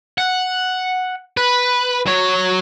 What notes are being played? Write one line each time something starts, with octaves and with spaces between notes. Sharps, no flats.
F#5
B4
F#3 C#5